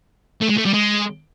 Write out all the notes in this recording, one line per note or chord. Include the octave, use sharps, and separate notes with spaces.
A3
G#3
A3
G3
G#3